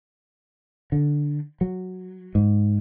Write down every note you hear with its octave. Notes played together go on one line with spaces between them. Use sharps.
D3
F#3
G#2